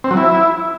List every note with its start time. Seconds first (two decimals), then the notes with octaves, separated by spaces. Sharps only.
0.04 C4
0.11 F#3
0.17 E4